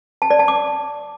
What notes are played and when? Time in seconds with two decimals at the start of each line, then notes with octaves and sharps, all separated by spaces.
0.22 A5
0.31 D5
0.39 A5
0.48 D6